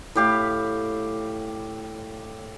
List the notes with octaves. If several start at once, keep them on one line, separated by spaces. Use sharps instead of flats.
A2 G4 F5